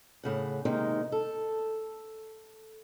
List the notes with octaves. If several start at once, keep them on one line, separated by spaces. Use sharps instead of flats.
A2 C#3 F#5
C3 D#3 G#3 A#3 D#4
A4